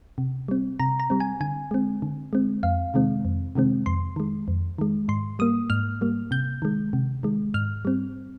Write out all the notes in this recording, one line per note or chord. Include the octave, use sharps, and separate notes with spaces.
C3
G3 C4
C3 A#5
A#5
G3 C4
G#5
D3 G#5
G#3 C4
D3
G#3 C4
F2 F5
C3 D#3 G#3 C4
F2
C3 D#3 G#3 C4
F2 C6
D#3 G#3
F2
D#3 G#3
G#2 C6
G3 A#3 D#6
G#2 F6
G3 A#3
C3 G6
D#3 G#3
C3
D#3 G#3
G#2 F6
G3 C4